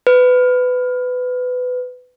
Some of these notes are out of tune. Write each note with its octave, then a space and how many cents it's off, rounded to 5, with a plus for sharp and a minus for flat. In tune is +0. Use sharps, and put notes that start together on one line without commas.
B4 +20